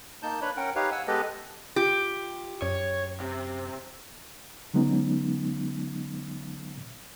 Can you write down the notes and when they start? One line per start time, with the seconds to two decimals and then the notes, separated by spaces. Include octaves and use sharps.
0.23 A#3 D#4 A5 G6
0.42 D4 B4 C#5 B5
0.57 C#4 A#4 F#5 G5
0.75 D#4 G4 B4 C#5 F5
0.92 F#5 G#5 E6
1.07 G#3 B3 G4 A4 B4 D#5
1.76 F4 G4
2.62 F#2 C#5
3.20 C3
4.74 D3 F#3 G#3 B3 C#4 D#4